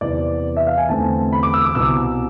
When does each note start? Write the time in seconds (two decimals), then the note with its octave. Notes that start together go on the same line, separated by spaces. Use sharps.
0.01 E2 C3 E3 D5
0.57 E5
0.67 F5
0.77 G#5
0.89 E2 D3 A3 C4 A5
1.33 B5
1.43 D6
1.54 E6
1.65 D6
1.75 C2 B2 B3 E6